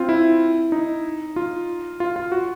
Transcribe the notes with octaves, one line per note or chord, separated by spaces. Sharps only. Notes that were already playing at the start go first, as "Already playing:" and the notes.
Already playing: C4 F4
E4
D#4
F4
F4
F4
F#4